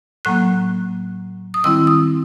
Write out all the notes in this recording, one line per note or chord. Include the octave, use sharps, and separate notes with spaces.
A2 F#3 A#3 F#6
D#6
D#3 G3 C4 E4 E6
D#6